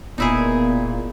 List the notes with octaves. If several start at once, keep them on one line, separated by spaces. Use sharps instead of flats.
E1 A#2 B3 D#4 E4 G#4